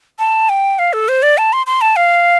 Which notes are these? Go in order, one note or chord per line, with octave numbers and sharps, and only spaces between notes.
A5
G5
F5
A4
C5
D5
A5
C6
C6
A5
F5